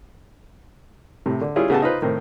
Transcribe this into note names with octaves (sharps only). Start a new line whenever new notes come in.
A2 C3
D3
G3 C#4 E4 F4 G#4
C#3 B3 F#4 G4 A4 A5
D#4 F4 B4 C5
A2 D#3 C4